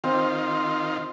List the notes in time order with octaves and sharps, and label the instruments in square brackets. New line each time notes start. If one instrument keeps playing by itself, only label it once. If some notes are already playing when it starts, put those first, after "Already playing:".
[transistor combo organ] D#3 F4 [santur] C4